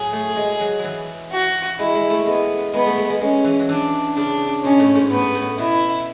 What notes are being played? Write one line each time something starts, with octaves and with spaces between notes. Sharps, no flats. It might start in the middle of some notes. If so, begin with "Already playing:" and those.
Already playing: A2 F#3 G#4
A3
G#3
F#3
E3 F#3
F#4
G#3 E4
G#3
A3
G#3 B3
G#3 B3
A3
G#3
G#3
G#3 C#4
E3
F#3
E3 D4
C#3 D4
B2 C#4
A2
G#2
A2 B3
A2
B2 E4